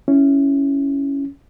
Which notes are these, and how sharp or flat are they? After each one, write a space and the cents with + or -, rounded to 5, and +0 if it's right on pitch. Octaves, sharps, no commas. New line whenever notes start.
C#4 +0 E4 +0